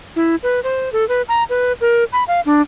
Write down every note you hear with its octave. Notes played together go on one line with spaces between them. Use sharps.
E4
B4
C5
A4
B4
A#5
B4
A#4
B5
F5
D4